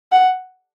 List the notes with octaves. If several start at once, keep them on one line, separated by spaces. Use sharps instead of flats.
F#5